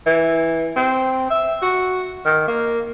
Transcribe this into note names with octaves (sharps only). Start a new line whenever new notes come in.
E3
C4
E5
F#4
D#3
A#3